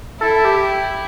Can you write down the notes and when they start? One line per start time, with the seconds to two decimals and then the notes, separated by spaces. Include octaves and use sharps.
0.21 E4 A4
0.45 G4